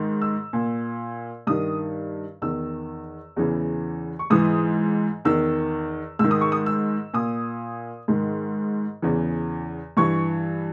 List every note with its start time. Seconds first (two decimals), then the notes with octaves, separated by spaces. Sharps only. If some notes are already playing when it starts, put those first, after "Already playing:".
Already playing: G#2 D#3
0.22 E6
0.53 A#2
1.47 G2 D#3 D#6
2.42 E2 D#3 E6
3.36 E2 C#3 E3
4.19 C#6
4.30 G#2 E3 D#6
5.25 E2 D#3 E6
6.19 G#2 D#3 E6
6.31 D#6
6.41 C#6
6.52 D#6
6.66 E6
7.14 A#2 D#6
8.08 G#2 D#3
9.02 E2 C#3 E3
9.97 G2 E3 C#6